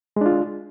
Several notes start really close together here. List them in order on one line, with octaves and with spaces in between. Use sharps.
G#3 D4 F4